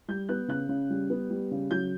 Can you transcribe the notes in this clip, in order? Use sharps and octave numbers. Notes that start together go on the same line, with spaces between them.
G3 G6
B3 F#6
C#3 F#6
C#3
G3
B3
G3
C#3
F#3 G6